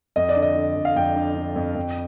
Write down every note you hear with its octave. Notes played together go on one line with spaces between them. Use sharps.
F2 D#5
D5
D3
D#5
D3
F2
F5
F2 G5
D3
D3
F2
F2